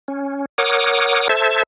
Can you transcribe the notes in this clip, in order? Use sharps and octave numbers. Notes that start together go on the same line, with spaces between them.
C#4
A#4 C#5 F#5 D6 D#6
A4 C5 E5 A5 G#6